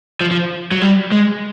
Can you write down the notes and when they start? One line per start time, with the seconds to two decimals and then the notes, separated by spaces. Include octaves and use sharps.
0.21 F3
0.31 F3
0.71 F#3
0.82 G3
1.12 G#3